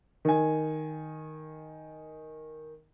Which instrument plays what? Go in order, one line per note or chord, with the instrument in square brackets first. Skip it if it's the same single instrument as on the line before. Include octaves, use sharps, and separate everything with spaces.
[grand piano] D#3 G#5